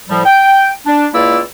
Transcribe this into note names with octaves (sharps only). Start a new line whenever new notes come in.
A2 F3 G3
G5
D4
C#2 A#3 E4 F4 D5 E6